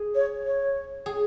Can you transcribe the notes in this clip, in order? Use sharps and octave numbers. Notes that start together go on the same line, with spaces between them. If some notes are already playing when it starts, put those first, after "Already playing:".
Already playing: G#4
C#5
C#5
G#4